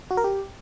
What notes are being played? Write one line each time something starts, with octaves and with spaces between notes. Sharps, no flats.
F#4
A#4
G4